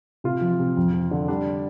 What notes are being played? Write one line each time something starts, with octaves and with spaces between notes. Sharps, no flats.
C3 F4
F3
C3
F2
F3
D3
G3 D4